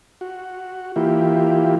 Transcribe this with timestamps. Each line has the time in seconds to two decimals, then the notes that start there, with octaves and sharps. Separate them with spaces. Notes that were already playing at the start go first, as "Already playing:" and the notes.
0.21 F#4
0.96 E3 A#3 E4 F4 G4